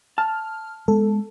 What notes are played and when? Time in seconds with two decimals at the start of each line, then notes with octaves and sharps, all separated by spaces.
0.18 A5 F6
0.88 G#3 B3 A4